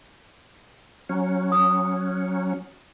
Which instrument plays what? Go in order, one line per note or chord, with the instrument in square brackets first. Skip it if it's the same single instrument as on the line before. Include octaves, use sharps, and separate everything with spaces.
[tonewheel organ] F#3 C#4
[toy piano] D#6